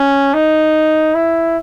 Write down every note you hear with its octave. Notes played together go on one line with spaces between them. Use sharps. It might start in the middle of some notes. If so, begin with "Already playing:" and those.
Already playing: C#4
D#4
E4